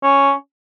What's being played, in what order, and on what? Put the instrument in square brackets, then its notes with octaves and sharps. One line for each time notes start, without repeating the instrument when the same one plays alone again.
[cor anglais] C#4